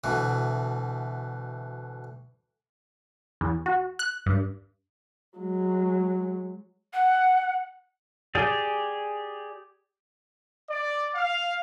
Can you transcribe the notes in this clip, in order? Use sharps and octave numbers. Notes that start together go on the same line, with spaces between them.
D2 B2 E3
E2
F#4
F#6
G2
F#3 G#3
F#5
G4 G#4 D5
D5
F5